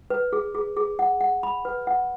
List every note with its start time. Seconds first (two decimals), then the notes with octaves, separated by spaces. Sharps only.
0.10 B4
0.33 G#4
0.55 G#4
0.76 G#4
0.99 F#5
1.21 F#5
1.43 B5
1.65 B4
1.87 F#5